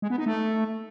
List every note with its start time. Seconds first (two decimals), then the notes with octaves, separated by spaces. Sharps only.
0.02 G#3
0.10 B3
0.18 D#4
0.26 A3